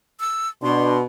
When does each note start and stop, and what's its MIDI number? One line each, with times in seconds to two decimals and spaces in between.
0.20 0.49 88
0.63 1.02 47
0.63 0.97 62
0.63 0.97 84